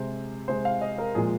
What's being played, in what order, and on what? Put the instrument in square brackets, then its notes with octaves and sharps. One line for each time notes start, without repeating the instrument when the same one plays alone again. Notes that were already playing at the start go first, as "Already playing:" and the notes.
Already playing: [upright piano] C3 G#3 C5
C3 G#3 C5
F5
D#5
A#4
A#2 F3 G#3 G#4